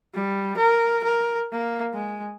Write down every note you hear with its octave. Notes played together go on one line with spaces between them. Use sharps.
G3
A#4
A#4
A#3
G#3